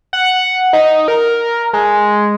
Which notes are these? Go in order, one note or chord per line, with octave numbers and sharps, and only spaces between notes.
F#5
D#4
A#4
G#3